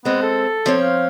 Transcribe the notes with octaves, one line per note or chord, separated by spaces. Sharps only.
G#3 B3 C4
A4
F3 C4 C#5
F5